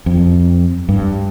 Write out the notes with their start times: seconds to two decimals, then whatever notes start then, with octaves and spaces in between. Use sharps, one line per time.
0.06 F2
0.89 G2